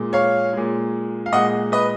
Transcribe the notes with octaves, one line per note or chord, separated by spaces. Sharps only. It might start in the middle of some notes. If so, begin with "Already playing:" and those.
Already playing: A#2 G#3
C#5 F5
A#2 G#3
F5
A#2 G#3 D#5 F#5
B4 D#5